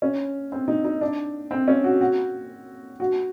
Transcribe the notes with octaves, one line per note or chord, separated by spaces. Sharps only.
C#4
C4
D#4
D#4
D4
C4
C#4
F#4
F#4
F#4